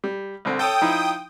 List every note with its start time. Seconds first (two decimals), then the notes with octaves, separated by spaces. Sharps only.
0.04 G3
0.45 C2 D3 C4
0.59 A4 C#5 G5 D#6
0.81 F3 D#4 E4